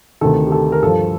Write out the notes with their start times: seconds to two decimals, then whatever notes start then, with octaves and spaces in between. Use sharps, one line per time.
0.21 D2 C3 D#3 A4
0.47 G4
0.52 A4
0.72 A#4
0.82 G2 F3 A4